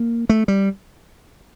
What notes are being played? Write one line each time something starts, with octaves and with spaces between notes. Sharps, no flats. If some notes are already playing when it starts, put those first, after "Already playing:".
Already playing: A#3
A3
G3